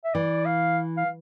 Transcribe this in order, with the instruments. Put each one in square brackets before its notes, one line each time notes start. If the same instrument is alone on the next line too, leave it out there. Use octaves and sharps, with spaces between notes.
[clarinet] E5
[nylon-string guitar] E3 [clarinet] D5
[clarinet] F5
F5